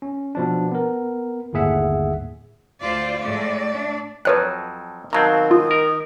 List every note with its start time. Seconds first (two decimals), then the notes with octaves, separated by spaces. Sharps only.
0.02 C#4
0.35 B2 F3 D4
0.72 B3 A#4
1.53 G1 D#2 A2 G#4 E5 F#5
2.80 D2 F4 C5 D5
3.22 A2 G#3 A3 D5
3.70 A3 D4
4.25 F2 F3 F#3 B4 C#5 F#6
5.13 B2 D#3 F#3 C4 F5 A5 A#5
5.51 F4 D#6
5.71 A#4